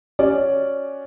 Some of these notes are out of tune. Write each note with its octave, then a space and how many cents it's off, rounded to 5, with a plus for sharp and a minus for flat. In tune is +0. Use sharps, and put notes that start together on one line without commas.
C#4 +0 F#4 +0 D5 +0